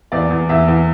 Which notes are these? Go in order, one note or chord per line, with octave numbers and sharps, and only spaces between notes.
E2 D5
E2
E2 E5
E2